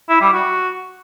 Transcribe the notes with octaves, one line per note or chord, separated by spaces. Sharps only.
E4
G3
F#4